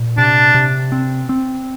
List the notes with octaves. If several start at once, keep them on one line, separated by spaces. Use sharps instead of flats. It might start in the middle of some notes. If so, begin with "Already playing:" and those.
Already playing: A#2
C3 D4
C3
C4
C4